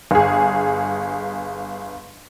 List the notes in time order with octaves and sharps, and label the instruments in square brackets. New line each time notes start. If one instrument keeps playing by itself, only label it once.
[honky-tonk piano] G1 G#4